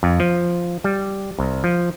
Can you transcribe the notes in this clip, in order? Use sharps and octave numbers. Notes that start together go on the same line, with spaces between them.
F2
F3
G3
C2
F3